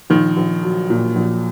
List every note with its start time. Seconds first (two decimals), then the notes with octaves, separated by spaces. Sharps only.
0.10 A#1 D#3
0.37 A#1
0.63 F#3
0.90 A#2
1.16 A#1